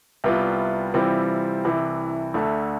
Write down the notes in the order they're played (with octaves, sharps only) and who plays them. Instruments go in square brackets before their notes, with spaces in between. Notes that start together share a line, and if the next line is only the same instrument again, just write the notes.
[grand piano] C2 C3 G3 B3 F4
C3 E3 G3 C4 F4
C2 C3 E3
D2 D3 A3